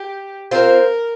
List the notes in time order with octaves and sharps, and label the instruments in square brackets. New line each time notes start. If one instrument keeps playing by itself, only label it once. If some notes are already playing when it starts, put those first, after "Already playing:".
Already playing: [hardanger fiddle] G4
[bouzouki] C4 F4 C5 [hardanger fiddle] A#4